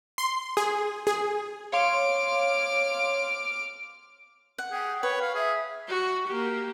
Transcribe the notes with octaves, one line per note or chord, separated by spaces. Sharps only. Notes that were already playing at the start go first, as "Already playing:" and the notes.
C6
G#4
G#4
C#5 F5 C6 D6 F6
F#5
G#4 G5
B4 C#5
F5
G#4 E5
F#4
A#3 G4